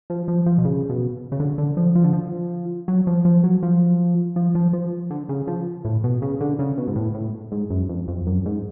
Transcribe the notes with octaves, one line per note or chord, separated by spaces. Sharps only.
F3
F3
F3
B2
C#3
B2
C#3
D3
D3
F3
F3
D3
F3
F#3
F3
F3
F#3
F3
F3
F3
F3
D3
C#3
F3
A2
B2
C#3
D3
C#3
B2
G#2
A2
A2
G#2
F#2
F2
F2
F#2
G#2